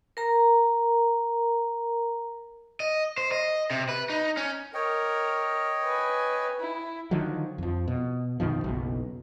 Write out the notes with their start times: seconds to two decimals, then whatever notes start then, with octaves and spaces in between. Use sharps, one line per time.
0.17 A#4 A#5
2.80 D#5
3.18 C5
3.32 D#5
3.71 C3
3.89 B4
4.10 D#4
4.37 C#4
4.74 A#4 C#5 D#5 G5
5.84 B4 G#5
6.60 E4
7.11 D3 D#3 F3 F#3
7.58 F2 F3
7.88 B2
8.40 F#2 B2 D#3 F3
8.64 F#1 B1 B2